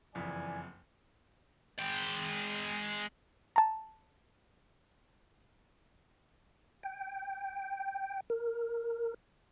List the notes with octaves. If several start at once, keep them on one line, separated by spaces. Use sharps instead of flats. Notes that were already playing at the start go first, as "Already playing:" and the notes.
F#1 F2 E3 D5 G#5
G#3 G5
A5 A#5
G5
A#4